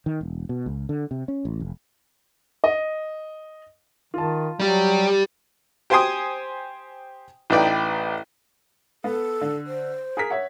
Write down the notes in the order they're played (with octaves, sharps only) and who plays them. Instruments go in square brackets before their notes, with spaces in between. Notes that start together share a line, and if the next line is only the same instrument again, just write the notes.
[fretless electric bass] D#3
E1
B2
C#2
D3
C3
C#4
A1
F1
[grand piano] D#5
[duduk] D#3 [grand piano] F4 A5
[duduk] F#3 [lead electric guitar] G3 G4
[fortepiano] G4 C5 G5 G#5 C6 D#6
A1 D#4 B4 D5 G5
[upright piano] B3 [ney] A4
[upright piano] D3
[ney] C5
[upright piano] G#4 A#4 B6
C#5 E5 F#5